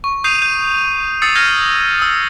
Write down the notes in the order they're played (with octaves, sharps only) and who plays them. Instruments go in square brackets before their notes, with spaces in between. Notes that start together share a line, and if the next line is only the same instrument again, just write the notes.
[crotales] C#6
D#6 G6 C7 D#7 F7
G6 D#7
D#6 E6 A6 C7 C#7
F6 G6 G#6 A#6 D#7
D#6 E6